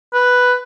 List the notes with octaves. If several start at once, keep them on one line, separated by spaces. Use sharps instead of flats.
B4